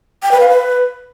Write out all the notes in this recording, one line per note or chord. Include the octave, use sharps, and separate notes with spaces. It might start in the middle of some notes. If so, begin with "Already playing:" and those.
G5
B4
F5
B4